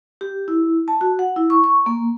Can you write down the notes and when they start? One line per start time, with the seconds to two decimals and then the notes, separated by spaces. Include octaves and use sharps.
0.21 G4
0.48 E4
0.88 A5
1.01 F#4
1.19 F#5
1.36 E4
1.50 C#6
1.64 C#6
1.86 A#3